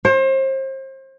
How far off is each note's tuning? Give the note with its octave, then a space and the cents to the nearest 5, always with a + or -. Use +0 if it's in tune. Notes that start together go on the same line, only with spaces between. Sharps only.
C5 +35